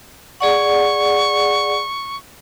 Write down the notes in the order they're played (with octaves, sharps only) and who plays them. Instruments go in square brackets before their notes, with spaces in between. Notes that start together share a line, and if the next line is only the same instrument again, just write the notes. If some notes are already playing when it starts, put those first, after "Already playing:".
[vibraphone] G#4 D5 F#5 [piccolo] C#6